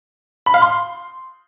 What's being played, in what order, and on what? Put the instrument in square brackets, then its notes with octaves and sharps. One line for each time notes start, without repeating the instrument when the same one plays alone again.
[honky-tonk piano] B5
F5
C6